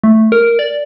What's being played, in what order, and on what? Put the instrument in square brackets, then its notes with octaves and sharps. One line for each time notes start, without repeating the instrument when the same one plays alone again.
[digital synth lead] A3
A#4
D5